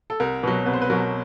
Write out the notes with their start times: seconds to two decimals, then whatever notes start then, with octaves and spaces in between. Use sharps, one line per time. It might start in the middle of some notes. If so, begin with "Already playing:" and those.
0.10 A4
0.20 C2 A#4
0.43 B2 F#3 B4
0.66 C2 B4
0.73 C5
0.82 B4
0.90 B2 F#3 A#4